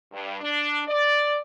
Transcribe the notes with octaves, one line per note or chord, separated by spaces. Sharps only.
G2
D4
D5